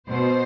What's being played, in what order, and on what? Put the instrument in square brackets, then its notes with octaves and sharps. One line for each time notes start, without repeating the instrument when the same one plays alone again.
[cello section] B2 C5